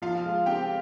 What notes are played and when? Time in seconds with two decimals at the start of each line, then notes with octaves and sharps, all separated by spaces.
0.02 F3 F4 F5
0.24 G#3
0.46 C4 G4 G5